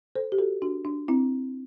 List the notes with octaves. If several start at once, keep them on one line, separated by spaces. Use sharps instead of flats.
A4 C5
G4
F#4 A4
D4 F#4
D4
C4 E4